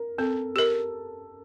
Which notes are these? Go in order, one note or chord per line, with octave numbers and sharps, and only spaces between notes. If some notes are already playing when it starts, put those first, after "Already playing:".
Already playing: A#4
C4 A4
G4 A#4